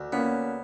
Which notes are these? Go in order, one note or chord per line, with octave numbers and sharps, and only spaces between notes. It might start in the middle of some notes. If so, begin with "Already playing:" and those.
Already playing: D2
A#3 B3 C#4